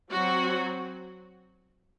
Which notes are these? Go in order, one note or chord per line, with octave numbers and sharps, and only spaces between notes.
F#3 C4 F#4